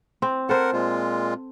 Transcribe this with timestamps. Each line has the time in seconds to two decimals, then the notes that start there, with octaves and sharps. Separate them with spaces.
0.22 C4
0.49 A4 A#4 C5 F#5
0.73 A#2 G#3 F4